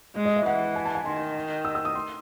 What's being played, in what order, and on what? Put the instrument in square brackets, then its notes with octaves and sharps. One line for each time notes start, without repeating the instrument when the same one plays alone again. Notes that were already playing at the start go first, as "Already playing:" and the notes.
[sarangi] G#3 [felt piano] D#5
[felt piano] D#5
E5
[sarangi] E3 [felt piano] F#5
[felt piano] G#5
A5
G#5
[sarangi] D#3 [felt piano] C6
[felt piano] E6
E6
D#6
C6